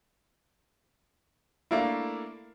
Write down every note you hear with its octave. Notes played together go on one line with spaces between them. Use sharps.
A3 A#3 D4 E4